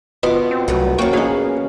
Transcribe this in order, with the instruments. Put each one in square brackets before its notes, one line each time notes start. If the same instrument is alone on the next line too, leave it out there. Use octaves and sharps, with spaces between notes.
[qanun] B2 F4 D6 [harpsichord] B3 D#5 B5
[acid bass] C4
[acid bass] C2 [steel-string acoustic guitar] F#3 A3 B4
[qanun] F#3 A5 C#6 [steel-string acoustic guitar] A#3 C#4 [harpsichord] F#4 G5
[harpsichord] A#1 D#4 [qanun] F#4 F5 B5 [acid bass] G#4